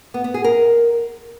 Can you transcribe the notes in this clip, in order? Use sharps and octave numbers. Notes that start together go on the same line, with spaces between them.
B3
B3
G#4
A#4